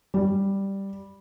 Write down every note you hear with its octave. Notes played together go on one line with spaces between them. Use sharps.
G3